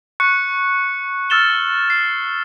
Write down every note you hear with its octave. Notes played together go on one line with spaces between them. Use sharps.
C#6 F#6 C#7
E6 F6 A6 E7 G7
C7